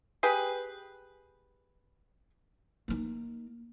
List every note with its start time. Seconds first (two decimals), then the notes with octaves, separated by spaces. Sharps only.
0.23 G4 G#4 B4
2.88 A#3 D#4